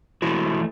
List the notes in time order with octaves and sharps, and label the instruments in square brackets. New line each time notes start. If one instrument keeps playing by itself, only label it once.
[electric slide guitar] E3 A3 E4 F#4